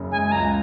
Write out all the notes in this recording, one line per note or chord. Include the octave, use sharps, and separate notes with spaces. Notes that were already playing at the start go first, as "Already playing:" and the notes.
Already playing: F#1 F#2 C#3
G#3 G#5
G#5
C#2 A#5